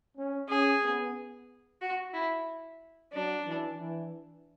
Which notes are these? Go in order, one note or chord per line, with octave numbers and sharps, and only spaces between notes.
C#4
C#4 G#4
B3
F#4
E4
F#3 D4
E3
E3